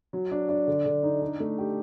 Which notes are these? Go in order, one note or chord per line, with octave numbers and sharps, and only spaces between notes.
F#3
D4
D4
D3
D3
D#4
D4
A3
G4